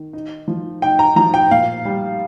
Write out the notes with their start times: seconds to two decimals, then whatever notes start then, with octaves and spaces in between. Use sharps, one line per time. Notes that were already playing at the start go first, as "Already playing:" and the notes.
Already playing: D#3
0.13 D#4
0.48 F3
0.82 D#4 G5
0.99 A#5
1.16 F3 A#5
1.34 G5
1.51 A#2 F5
1.85 G3